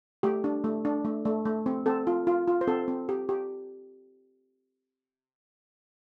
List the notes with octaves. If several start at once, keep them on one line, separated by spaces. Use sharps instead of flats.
A3 G4
D4
A3
D4
A3
A3
A3
C4
C4 A4
F4
F4
F4
C5
C4 A4
C4
G4
G4